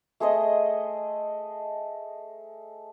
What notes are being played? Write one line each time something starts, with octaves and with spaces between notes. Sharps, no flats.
A3 G#4 C5 D#5